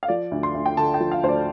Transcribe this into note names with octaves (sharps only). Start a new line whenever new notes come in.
F5
F3 D5
D2
C6
D2
G5
D3 A5
G5
F3
F5
D2 C5
D5